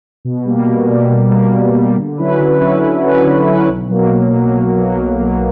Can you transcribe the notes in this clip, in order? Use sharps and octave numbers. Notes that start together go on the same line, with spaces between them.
B2
G3 A#3
B2
G3 A#3
B2
G3 A#3
B2
G3 A#3
D3
F#3 C#4 E4 B4
D3
F#3 C#4 E4 B4
D3
F#3 C#4 E4 B4
D3
F#3 C#4 E4 B4
B1
B2 F#3 A#3
B1
B2 F#3 A#3
B1
B2 F#3 A#3
B1
B2 F#3 A#3